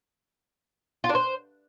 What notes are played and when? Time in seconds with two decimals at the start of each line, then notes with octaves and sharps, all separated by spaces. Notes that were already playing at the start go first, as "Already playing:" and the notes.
1.04 F4
1.09 D4
1.15 C5